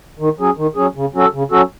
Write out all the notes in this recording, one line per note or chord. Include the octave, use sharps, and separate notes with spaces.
D#3
F#3 C#4 G#4
D#3
F#3 C#4 G#4
C#3
F#3 C#4 F#4 A4
C#3
F#3 C#4 F#4 A4